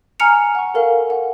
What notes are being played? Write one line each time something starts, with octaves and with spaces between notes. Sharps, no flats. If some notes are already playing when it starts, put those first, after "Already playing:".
G#5 A#5 F6 C#7 F7
F#5 C#6
A4 A#4 F5 G#5
F#5